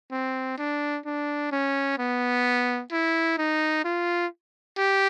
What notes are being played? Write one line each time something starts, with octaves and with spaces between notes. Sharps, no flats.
C4
D4
D4
C#4
B3
E4
D#4
F4
G4